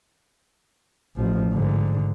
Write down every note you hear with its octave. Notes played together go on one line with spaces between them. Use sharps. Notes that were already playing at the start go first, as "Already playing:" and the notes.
A1 F3
G#2 D3